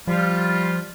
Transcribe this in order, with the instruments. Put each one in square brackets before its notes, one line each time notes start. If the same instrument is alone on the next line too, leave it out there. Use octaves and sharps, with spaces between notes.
[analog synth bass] F3 [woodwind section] G3 F4